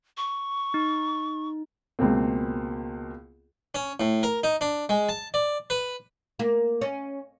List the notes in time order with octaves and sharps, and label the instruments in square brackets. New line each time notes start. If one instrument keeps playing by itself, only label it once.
[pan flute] C#6
[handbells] D#4
[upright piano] C#2 B2 A#3 C4
[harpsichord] C#4
A2
A#4
D#4
D4
G#3
A5
D5
B4
[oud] A#3
C#4